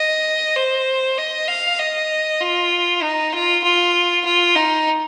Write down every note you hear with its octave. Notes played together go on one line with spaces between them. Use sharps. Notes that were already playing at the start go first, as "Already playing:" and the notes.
Already playing: D#5
C5
D#5
F5
D#5
F4
D#4
F4
F4
F4
D#4